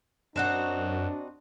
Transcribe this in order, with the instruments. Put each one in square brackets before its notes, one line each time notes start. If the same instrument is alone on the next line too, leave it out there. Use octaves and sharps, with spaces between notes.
[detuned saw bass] F#2 [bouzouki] C4 D#4 F#4 [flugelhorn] D4 [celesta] F#5 F#6 E7